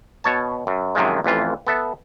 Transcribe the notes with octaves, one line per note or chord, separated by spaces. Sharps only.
B2 C#5 A5
F#2
F#2 C3 D#3 F3 G#3
A1 F2 E3 F4
B3 A4 E5